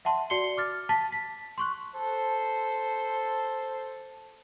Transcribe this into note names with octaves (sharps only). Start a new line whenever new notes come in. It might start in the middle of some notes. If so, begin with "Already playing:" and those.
E5 F#5 A5 C6
F#4 D5 C6 C7 C#7 G7
D6 F6 A6
A5 A6 B6
B6
C6 C#6 F#6
A4 C5